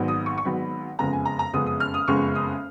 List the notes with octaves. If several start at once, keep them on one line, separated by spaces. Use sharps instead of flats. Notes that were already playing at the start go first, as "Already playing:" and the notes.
Already playing: G#1 G#2 F#3 B3
D#6
C#6
C#6
G#1 G#2 F#3 B3 B5
F#1 F2 C#3 G#3 B3 A#5
G#5
A#5
A#5
F#1 F2 C#3 G#3 B3 D#6
D#6
F6
D#6
F#1 F2 C#3 G#3 B3 C#6
D#6